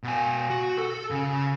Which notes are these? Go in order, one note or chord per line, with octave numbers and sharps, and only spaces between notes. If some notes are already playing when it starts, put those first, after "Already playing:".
B2 G#5
F#4
A4
C#3